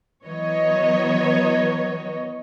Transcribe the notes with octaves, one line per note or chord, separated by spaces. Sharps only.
E3 F#3 B3 C#5 D#5